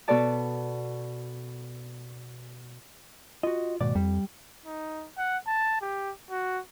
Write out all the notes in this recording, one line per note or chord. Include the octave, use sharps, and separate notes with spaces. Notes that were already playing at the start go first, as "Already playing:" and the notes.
B2 B3 F#4 A4 D5 A5
F4 F#4 D#5
D#2 G#2 B2 D5
F2 G3
D#4
F#5
A5
G4
F#4